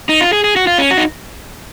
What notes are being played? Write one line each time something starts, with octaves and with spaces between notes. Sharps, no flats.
D#4
F4
G#4
G#4
F#4
F4
C#4
F#4
D#4